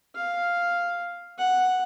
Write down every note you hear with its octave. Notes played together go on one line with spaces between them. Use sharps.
F5
F#5